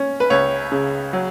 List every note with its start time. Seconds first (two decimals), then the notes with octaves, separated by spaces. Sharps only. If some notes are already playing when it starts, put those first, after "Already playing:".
Already playing: C#4
0.20 B4
0.30 C#2 C#5
0.72 C#3
1.13 F#3